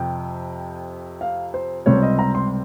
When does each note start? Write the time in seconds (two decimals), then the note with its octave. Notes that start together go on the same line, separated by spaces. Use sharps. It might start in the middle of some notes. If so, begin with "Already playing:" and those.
Already playing: F2 C3 G5
1.21 F5
1.54 C5
1.86 C#2 C3 G3 C4 C#5
2.02 D#5
2.19 A#5
2.35 C6